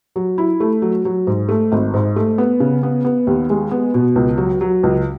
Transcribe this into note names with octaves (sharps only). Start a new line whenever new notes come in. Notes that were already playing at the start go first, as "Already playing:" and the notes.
F#3
E4
A3
F#3
F#3
G#2
A3
G#1
G#2
A3
B3
C#3
B3
B3
D#2
G#3
B3
B2
C#2
F#3
F#3
C#2